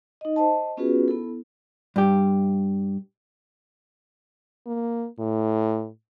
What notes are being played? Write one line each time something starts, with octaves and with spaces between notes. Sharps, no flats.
D#4 D#5
C5 D#5 A5
B3 C#4 F4 F#4 G#4 B4
B3 E4 A4
G2 G4
A#3
A2